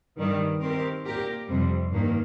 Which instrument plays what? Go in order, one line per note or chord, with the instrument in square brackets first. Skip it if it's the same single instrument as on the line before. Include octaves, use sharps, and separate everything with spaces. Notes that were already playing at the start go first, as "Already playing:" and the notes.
[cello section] G2 D#3 G3
D#3 C4 G4 A#4
A#2 A#3 G4 A#4
F2 C3 G3
G2 D#3 A#3